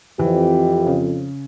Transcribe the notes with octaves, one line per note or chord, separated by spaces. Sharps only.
F2 E3 G4
C#3